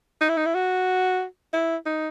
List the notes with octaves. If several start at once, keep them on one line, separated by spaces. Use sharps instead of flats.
D#4
E4
D#4
E4
F#4
E4
D#4